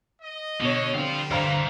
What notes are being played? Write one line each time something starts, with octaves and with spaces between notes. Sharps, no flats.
D#5
B2 D3 C#5
D3 G3 C4 C5 F5
G2 E3 C5 F5 A#5